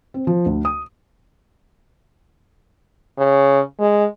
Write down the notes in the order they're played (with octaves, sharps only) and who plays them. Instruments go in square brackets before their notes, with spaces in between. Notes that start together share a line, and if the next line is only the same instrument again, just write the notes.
[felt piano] C4
F3
D2
D#6
[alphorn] C#3
G#3